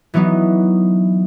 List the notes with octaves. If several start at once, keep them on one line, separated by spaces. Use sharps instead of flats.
E3 F#3 B3 D#4